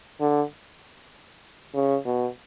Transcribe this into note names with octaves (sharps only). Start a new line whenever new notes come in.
D3
C#3
B2